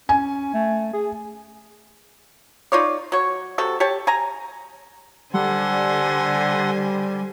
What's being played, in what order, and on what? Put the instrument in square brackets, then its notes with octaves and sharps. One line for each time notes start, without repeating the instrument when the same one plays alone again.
[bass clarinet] C#4 [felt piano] G#5
[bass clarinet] A3
G#4
[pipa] D#4 F4 C#5 D5
F#3 C#5
C3 F#4 A4
G4 C#5 A5
G#5 A#5
[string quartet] D3 C5 G#5 [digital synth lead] G3 [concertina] A4 F#5 C6